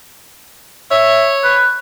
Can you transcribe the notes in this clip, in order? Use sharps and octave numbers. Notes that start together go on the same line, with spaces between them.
C#5 E5
B4